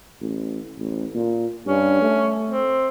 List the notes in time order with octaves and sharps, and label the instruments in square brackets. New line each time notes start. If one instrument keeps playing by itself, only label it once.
[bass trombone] A1
A1
A#2
[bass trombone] G2 [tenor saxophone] C#4
[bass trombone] A3
[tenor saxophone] C4